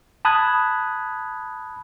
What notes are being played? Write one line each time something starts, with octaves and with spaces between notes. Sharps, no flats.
A5 B5 D#6 F#6 G#6